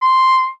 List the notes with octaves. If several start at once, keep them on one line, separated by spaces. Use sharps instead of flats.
C6